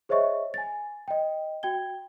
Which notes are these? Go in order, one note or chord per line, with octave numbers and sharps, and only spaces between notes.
G#4 C5 C#5 D#5 E5 C#6
G#5 A6
D#5 G5
F#4 G5 G#6 G7